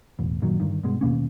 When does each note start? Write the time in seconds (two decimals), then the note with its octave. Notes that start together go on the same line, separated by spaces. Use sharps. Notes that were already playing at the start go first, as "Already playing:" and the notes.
0.19 E1 A1
0.42 F#2 A#2 D#3 F#3
0.60 G1 G2 D#3
0.83 G2 B2 G#3
1.01 D#2 B2 A#3 C#4